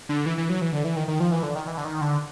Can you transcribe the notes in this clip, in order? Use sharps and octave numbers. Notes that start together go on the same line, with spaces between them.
D3
E3
E3
F#3
E3
D3
E3
D#3
D#3
F3
E3
D3
D#3
E3
D3
D#3
D3